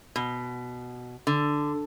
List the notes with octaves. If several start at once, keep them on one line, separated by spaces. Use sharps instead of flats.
B2
D3